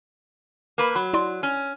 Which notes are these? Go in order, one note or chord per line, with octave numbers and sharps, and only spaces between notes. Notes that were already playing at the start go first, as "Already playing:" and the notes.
A#3 B4
F#3 B5
E4 D5 C6
C#4